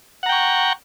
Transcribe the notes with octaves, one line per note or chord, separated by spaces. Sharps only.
F#5 G5 A#5 C#6